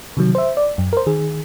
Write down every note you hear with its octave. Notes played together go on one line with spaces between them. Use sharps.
C3 D#3 F#3
C5 E5
D5
F#2
A#4 C5
D#3 G#4